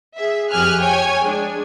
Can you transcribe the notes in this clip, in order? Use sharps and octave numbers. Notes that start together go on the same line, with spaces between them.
G#4 E5
F2 G4 G#4 G#5 F6 F#6
C#5 G5 G#5
G#3 D4